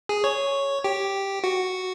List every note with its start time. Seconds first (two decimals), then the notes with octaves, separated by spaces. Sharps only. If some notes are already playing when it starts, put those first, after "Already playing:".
0.09 G#4
0.24 C#5
0.84 G4
1.44 F#4